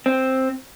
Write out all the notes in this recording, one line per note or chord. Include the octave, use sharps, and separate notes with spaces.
C4